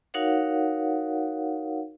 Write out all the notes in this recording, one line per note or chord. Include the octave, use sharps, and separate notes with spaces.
D#4 F#4 A#4 C#5 F5 F#5